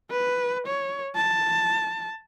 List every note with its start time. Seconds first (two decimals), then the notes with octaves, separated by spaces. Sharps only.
0.10 B4
0.66 C#5
1.16 A5